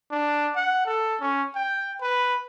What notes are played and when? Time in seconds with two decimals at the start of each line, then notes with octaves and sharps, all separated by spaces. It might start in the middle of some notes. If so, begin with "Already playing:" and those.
0.11 D4
0.56 F#5
0.86 A4
1.21 C#4
1.55 G5
2.01 B4